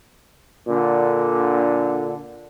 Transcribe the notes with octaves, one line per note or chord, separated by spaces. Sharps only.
A#2 D3